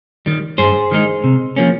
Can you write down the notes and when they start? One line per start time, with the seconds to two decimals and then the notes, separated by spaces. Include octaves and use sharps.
0.26 D#3 G3
0.58 G2 G#4 C5
0.91 D#3 G#3 D#4
1.24 C3
1.56 F3 A#3 C#4